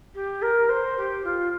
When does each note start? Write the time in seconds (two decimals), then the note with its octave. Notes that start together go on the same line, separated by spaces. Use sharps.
0.14 G4
0.42 A#4
0.69 C5
0.97 G4
1.24 F4